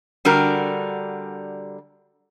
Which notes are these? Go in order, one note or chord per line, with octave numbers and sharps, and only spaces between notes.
D3 G3 D4 F#4 A#4